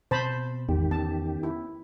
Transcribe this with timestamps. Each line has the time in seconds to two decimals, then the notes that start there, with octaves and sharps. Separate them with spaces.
0.11 B2 C4 C5 A5 B5
0.69 G#1 E2 D#3 G4
0.91 B3 C#4 A5
1.43 E4